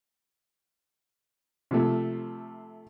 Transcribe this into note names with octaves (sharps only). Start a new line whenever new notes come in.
C3 F3 A3